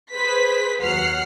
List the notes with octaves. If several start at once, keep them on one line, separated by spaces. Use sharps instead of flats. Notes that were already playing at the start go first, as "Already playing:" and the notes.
G#4 B4 C5 B6
D#2 F#3 F#5 F6 C7